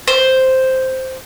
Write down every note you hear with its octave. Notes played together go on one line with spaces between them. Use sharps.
C5